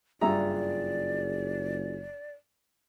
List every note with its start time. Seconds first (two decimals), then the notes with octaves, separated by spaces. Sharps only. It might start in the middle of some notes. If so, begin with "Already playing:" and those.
0.21 F#1 G2 F4 G#4 D5 E5 A#5